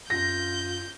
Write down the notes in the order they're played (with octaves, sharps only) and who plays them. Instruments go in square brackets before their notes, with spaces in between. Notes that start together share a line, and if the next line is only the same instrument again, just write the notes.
[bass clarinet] F#2 [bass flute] F4 [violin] G6 [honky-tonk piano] A#6